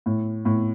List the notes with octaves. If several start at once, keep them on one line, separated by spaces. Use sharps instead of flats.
A2
A2